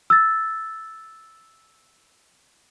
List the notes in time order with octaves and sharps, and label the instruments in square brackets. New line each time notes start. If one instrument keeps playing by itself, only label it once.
[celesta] E6 A6